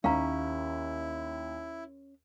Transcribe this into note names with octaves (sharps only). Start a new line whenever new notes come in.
D#2 C#4 E4 F5 A#5